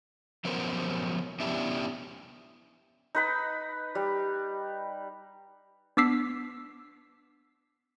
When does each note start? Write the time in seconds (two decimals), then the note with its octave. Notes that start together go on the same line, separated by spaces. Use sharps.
0.45 F3 F#3 B3 C#4 A#4 C5
1.40 B3 C#4 D4 E4 G4 E5
3.15 D#4 B4 B5
3.95 G3
5.97 B3 D4 D6 E6 B6 C7